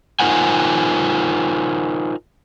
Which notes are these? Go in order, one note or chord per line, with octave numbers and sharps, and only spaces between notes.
D#4 F4 A#4 C5 F#5 G#5